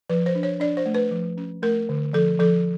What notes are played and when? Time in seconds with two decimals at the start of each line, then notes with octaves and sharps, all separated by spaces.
0.10 F3 B4
0.26 C5
0.35 D4
0.43 C#5
0.60 D4 D5
0.77 C5
0.86 A3
0.94 B4
1.11 F3
1.37 C#4
1.62 A3 A#4
1.89 D3
2.13 F3 A4
2.39 F3 A4